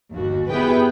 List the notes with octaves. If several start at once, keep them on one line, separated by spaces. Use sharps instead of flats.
G1 D#2 F#4
B3 E4 G4 G#4 B4 G5